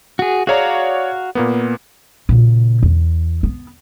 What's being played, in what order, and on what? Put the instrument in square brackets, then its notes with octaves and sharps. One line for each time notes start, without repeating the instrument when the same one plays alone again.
[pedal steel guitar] F#4 G#4
[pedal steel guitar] F#4 F5 A#5 [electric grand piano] G#4 C#5 D5
[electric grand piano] A#2 A#3 B3
[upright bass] A#2 C#3
E2
B3